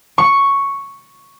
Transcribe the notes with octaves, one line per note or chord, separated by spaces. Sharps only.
C#6